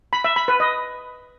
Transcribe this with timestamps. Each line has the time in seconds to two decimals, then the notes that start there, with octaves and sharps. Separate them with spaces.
0.13 B5
0.24 E5
0.36 B5
0.48 B4
0.60 D#5